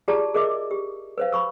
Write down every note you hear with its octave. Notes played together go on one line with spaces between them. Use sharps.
F4 G4 G#4 D5 A5 A#5
G#4 A#4 D#5 E5 D6
G4
B4 C5 F5
B5 C#6 E6